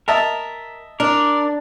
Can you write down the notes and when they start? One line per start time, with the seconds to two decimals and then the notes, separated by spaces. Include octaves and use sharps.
0.08 A#4 D#5 E5 A5
1.00 D4 A#4 D6